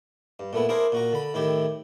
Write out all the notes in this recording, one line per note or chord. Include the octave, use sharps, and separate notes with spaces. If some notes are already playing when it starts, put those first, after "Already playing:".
G2
A#2 A3 B3 E4
D4 E4 G#4 A#4 C5
A#2 F#4 A#5
D3 B5
A2 D#3 E4 G4